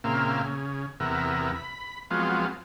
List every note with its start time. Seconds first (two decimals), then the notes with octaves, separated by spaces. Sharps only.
0.04 A#2 C#3 A#3 C4 E5 F5
0.44 C#3
1.00 E2 C3 B3 A#4 E5
1.56 B5
2.11 F3 F#3 G#3 B3 C4 F4